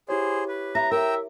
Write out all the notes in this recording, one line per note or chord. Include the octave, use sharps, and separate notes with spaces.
E4 G4 G#4 C5 C#5
B4
E5 A#5
A#4 E5 G5 A#5 E6